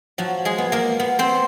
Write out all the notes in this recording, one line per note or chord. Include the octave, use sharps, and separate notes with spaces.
F3 F#3 F#4
G#3 G#4
B3
A#3 A#4
B3
C4 C5